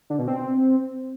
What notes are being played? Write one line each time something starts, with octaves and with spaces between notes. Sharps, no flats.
D3
B2
C4